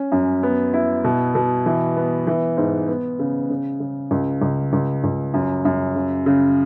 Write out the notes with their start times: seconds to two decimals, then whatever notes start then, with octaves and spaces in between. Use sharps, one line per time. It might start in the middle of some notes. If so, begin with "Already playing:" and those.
Already playing: C#4
0.12 F#2
0.43 B3
0.74 E4
1.04 B2
1.35 B2
1.66 E3
1.97 B3
2.27 E3
2.57 G#2
2.88 B3
3.19 C#3
3.50 C#3
3.80 C#3
4.11 C#2
4.42 C#2
4.73 C#2
5.04 C#2
5.34 F#2
5.65 F#2
5.96 C#3
6.26 C#3